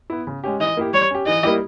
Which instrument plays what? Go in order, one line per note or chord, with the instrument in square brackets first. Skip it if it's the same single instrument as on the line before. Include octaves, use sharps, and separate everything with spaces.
[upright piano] B3 E4
C#3
G#3 C#4 G4
[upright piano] E3 [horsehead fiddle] D#5
[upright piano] A#3 E4 G4
[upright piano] G3 [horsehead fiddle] C#5
[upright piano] C#4 G4
[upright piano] E3 [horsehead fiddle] D#5
[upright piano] G3 A#3 E4 G4